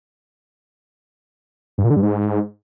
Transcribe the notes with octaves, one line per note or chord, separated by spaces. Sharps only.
G2
A#2
D3
G2
G#2